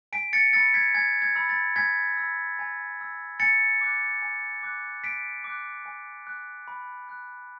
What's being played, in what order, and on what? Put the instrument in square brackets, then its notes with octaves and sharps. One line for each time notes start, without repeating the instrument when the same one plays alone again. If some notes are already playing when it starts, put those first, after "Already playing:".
[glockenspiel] G#5 B6 D7
A6 C#7
B5 E6 A6 C#7
G#6 B6
G#5 G#6
G#6
B5 E6
A6
G#5 G#6 B6
B5 E6
G#5
B5 E6
G#5 A6 C#7
D6 F#6
G#5
D6 F#6
G#5 B6 D7
D6
F#6
G#5
D6 F#6
B5
F#6